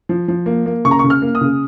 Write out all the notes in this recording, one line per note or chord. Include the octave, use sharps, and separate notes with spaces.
F3
F3
A#3
A#3
C#3 C#6
A#5
C#3 C#6
F6
A#3
D#6
C#3